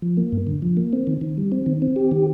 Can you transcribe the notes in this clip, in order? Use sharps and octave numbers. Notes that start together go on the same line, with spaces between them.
F3
A#3
G2
D3
F3
A#3
C4
D#3
D#3
G3
C4
D#3
C4
G4
D#3